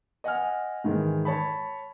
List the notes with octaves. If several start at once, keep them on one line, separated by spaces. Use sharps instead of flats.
D#5 F#5 G#5 F6
G#2 D#3 E3 G#3
C#5 A5 B5